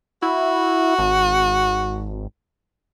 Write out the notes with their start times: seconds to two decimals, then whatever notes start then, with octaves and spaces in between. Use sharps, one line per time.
0.22 E4 F#4
0.99 G#1